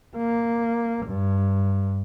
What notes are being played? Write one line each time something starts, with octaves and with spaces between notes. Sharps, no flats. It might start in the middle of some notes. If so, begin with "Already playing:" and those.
A#3
G2